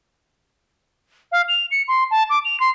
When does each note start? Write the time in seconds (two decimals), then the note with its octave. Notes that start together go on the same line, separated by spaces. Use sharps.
1.31 F5
1.48 F7
1.71 C#7
1.88 C6
2.10 A5
2.29 D6
2.44 F7
2.60 C6